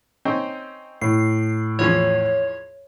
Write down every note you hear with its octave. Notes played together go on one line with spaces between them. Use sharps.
C4 C#4 D#4
A2 C7
E2 F3 C#4 C#5